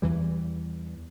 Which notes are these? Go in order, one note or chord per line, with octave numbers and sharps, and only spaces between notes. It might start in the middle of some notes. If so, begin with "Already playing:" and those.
E2 E3 G3